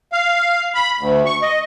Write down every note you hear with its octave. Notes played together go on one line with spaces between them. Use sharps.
F5
B5
D2
C#6
D#5